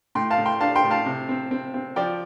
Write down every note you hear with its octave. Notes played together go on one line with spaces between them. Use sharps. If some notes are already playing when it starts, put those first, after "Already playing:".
A2 G5 C6
F5 A5
A2
G5 C6
D4 F5 A5
G5 C6
A2
F5 A5
C3
C4
C4
C4
F3 D5 G5